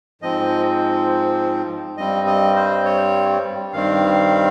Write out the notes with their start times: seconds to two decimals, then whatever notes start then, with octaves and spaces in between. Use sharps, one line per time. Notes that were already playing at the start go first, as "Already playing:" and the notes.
0.21 G#2 F3 C4 D#5
1.97 G2 G3 C4 D#5
2.27 D#5
2.56 C5
2.85 C#5
3.73 G2 D#3 G3 C4 F5